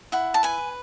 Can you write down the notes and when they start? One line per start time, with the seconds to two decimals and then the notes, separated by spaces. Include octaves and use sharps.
0.12 E4 F#5
0.34 A5
0.43 B4 G#5